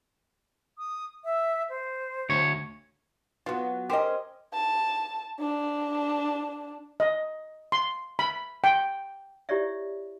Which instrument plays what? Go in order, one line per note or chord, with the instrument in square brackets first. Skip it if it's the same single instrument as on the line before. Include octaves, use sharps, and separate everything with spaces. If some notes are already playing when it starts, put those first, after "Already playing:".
[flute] D#6
E5
C5
[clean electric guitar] D2 C#5
[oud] F#3 B3 F#4 [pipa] F4
[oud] C#4 A#4 C5 [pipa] G4 D#5
[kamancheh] A5
D4
[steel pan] D#5
C6
B5
G5
[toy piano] E4 G4 C#5 D5 E5